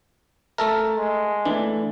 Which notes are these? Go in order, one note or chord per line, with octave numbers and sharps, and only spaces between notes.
A3 A4 A#4 E5 A5
G#3
E3 A3 D4